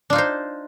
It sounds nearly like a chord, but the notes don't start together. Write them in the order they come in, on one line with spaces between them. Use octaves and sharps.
D4 F4 D#4 C5